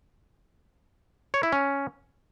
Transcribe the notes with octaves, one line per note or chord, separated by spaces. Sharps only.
C#5
E4
C#4